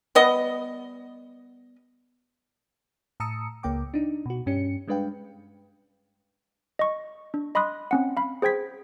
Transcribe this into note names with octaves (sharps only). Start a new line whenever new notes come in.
G3 B3 D#5
A2 A5 A#5 D#6 E6 C#7
C#2 A#3 G5 D6
D4 D#4
B2 F#4
G2 C#4 G4 C#7
G3 G#3 D4 B4 F5 G5
D#5 C#6
D4
D#5 B5 C6 D#6 F#6
C4 C#4 F#5
F5 B5
G#4 C5 G5 G#6 B6